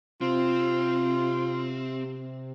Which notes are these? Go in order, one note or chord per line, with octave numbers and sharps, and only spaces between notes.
C3 C4 F4